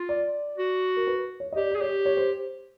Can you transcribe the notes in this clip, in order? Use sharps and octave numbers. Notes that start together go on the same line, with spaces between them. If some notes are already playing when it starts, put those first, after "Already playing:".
Already playing: F4
D5
F#4
A#4
B4
C#5
D#5
G4 D5
G#4 D5
G4 C#5
C#5
C5